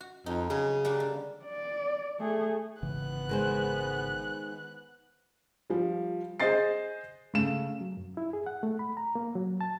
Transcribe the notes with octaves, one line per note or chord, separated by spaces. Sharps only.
F#4
F2 D#4
C#3 F#3 G#4
G3 A#3 D4
D3
D5
A3 G#4
G#1 C#3 E3 B3 F#6
D#3 G#3 C5
F3 G3
G#4 C5 D#5 A6 C7
C#3 A3 E7
F#3
F#2
E4
G#4
F#5
A3
B5
A#5
A#3
F#3
A5